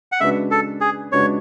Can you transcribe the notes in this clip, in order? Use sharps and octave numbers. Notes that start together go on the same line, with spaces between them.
F#5
C#3 G#3 D4 F#4 B4 E5
A4
G#4
C#3 G#3 D4 F#4 B4 C#5